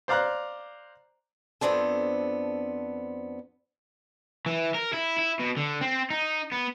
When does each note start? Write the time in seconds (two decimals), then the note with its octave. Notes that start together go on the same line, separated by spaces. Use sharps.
0.08 C5 D5 F5 A#5 F#6
1.61 F2 G#3 B3 C4 D4 A4
4.46 E3
4.74 A#4
4.93 E4
5.18 E4
5.39 B2
5.57 D3
5.81 C4
6.10 D#4
6.52 B3